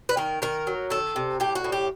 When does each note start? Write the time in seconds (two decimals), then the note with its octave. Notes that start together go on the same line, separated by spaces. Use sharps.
0.09 B4
0.17 D#3 A#4
0.42 D#3 A#4
0.67 F#3
0.90 D#3 A4
1.16 C3
1.40 A2 G4
1.55 F#4
1.64 A2
1.72 G4